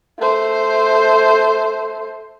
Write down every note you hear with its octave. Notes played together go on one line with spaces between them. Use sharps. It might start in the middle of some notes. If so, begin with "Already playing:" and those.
A3 C5